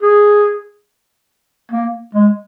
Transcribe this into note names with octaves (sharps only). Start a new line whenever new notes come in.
G#4
A#3
G#3